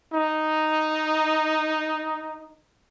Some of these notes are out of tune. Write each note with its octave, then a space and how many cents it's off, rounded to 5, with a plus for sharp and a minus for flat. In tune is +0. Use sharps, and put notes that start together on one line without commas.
D#4 -5